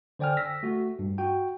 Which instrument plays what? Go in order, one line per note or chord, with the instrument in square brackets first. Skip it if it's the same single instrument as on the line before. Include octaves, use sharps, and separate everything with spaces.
[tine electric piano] D3 C5 D5 G5 G#5 F6
E6 A#6 B6
A3 F#4
G2
F#4 G5